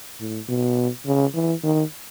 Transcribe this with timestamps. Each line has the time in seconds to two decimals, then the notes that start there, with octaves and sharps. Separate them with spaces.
0.20 A2
0.48 B2
1.05 C#3
1.34 E3
1.63 D#3